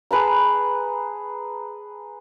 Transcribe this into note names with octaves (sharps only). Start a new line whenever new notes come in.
G#4 B4 A5 A#5